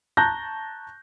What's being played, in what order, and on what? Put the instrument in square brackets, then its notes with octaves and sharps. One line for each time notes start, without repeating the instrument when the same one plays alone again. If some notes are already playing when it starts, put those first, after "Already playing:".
[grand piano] A5 A#5 C#6 F#6 G6 A#6